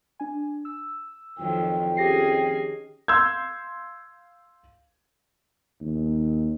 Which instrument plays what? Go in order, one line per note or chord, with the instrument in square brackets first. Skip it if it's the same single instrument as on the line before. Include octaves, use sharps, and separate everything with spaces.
[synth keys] D4 G#5
E6
[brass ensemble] F2 G5 [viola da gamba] D#3 F3 F#3
[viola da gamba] D#3 C#4 G#4 [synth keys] G4 A#6 C7
[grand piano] F5 C6 E6 G6 G#6
[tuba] D#2